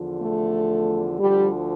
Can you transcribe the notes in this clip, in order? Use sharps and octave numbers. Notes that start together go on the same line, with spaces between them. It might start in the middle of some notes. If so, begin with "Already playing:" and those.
Already playing: E2 D3 F3
A3
D2 D3 F3 G3